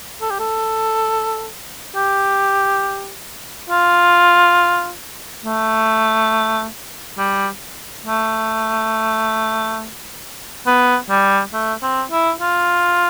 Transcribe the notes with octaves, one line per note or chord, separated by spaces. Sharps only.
A4
G4
A4
G4
F4
A3
G3
A3
B3
G3
A3
C4
E4
F4